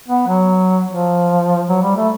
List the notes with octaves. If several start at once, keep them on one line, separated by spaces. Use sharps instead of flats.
B3
F#3
F3
F#3
G3
A3